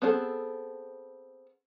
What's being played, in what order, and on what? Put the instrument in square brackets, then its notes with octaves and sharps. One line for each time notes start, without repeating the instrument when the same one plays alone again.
[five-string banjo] B3 C4 D4 G#4 A4